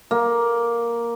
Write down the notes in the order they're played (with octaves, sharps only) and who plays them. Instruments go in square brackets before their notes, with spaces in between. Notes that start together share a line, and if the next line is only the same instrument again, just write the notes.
[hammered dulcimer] A#3